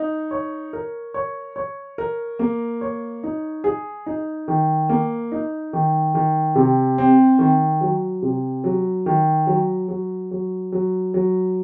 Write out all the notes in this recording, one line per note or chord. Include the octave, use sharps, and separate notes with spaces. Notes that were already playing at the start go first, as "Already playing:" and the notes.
Already playing: D#4
C#5
A#4
C#5
C#5
A#4
A#3
C#5
D#4
G#4
D#4
D#3
A#3
D#4
D#3
D#3
C3
C4
D#3
F#3
C3
F#3
D#3
F#3
F#3
F#3
F#3
F#3